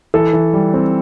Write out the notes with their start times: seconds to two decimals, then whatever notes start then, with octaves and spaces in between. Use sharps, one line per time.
0.14 E3 A4
0.33 E3
0.53 G3
0.74 C4